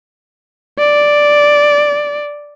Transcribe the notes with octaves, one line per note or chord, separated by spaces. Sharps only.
D5